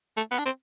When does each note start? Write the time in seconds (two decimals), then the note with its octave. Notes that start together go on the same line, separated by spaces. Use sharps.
0.17 A3
0.32 B3
0.39 D4
0.46 C4